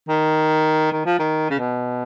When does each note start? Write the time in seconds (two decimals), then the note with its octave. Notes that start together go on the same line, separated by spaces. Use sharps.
0.09 D#3
0.92 D#3
1.06 F3
1.19 D#3
1.50 C#3
1.59 B2